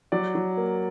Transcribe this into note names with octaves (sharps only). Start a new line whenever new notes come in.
F#3 D5
F#3
A#3